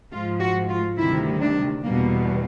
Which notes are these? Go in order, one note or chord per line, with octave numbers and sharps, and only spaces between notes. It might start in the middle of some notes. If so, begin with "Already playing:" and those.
G#2 F3 G#3 F4
F#4
F4
D2 C3 D#3 G3 E4
D4
E2 B2 G3 A#3